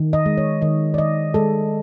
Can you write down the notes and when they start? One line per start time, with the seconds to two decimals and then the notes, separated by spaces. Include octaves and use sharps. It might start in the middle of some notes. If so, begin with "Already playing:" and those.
Already playing: D#3
0.13 D#5
0.26 G#3
0.38 C#5
0.62 D#3 D#5
0.94 D5
0.98 D#3 D#5
1.34 G#3 A4